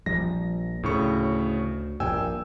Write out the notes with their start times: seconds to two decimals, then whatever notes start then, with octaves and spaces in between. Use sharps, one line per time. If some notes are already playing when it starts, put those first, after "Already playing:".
0.06 A#1 F3 G3 A#6
0.83 D2 A2 C#3 C#6
2.00 A#1 G2 A#2 G5 G#5 E6